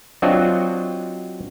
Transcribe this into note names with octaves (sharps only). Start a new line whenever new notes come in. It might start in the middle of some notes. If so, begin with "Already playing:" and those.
F#3 C4 D4 F4 F#4 D#5